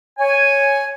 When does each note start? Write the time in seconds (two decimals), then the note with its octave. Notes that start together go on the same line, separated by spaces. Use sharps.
0.19 C#5 G#5